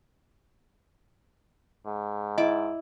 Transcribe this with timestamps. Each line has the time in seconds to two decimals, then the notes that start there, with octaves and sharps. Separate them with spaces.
1.86 G#2
2.38 E4 D#5 D6